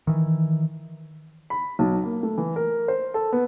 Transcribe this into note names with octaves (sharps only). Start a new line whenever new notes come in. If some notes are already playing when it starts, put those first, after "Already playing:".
D#3 E3
B5
B1
A#3
A3
E3
A#4
C5
A4
B3